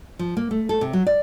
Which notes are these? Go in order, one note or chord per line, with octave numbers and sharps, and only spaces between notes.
F3
A#3
A3
A4
C3
F#3
D5